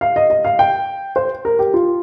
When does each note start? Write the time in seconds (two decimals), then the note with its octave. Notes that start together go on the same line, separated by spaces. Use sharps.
0.01 F5
0.16 D#5
0.30 D#5
0.45 F5
0.59 G5
1.16 C5
1.45 A#4
1.59 G4
1.74 F4